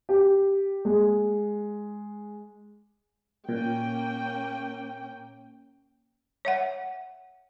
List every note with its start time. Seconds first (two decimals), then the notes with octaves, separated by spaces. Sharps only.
0.09 G4
0.85 G#3
3.49 A#2 A#3 C#4 G5
6.45 C#5 E5 F#5